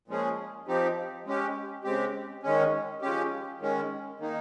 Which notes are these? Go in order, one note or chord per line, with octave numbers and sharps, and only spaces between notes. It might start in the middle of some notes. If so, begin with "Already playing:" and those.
A#2 F3 G#3 C#4 G#4
F3 C4 D#4 G4
G#3 C#4 G4
C#3 G#3 C4 G4
D#3 G#3 C#4
F3 G#3 C#4 G4
D#3 G#3 C#4
D#3 A#3 D#4